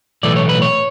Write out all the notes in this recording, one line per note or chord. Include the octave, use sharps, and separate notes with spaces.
B1 A2 E3 A3 D5
C#5
B4
C#5